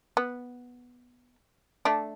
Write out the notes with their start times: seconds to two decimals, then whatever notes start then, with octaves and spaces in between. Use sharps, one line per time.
0.17 B3
1.85 A3 D4